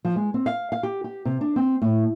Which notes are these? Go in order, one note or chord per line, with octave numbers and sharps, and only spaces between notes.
F3
G#3
C4
F5
F5
G4
G4
C3
D4
C4
A2